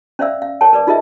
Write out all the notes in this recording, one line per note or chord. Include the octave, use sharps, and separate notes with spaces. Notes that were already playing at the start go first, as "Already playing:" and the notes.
C#4 C5 D5 E5 F5 E6
F5
A#4 C#5 G5 A5
A#4 B4 D5 D6
D#4 F4 G#4 A#4 D#5 E5